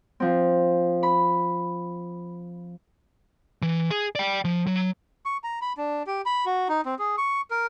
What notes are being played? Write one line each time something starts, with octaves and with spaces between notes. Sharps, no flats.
F3 C4
B5
E3
G#4
D5 G5
F3
F#3
C#6
A#5
B5
D4
G4
B5
F#4
D#4
C4
G#4
C#6
A#4